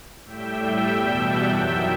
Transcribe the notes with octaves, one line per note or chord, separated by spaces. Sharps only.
A2 G3 E5 G5
E2 B2 G3
F#5 A5
F#2 D#3 F#3 E5 G5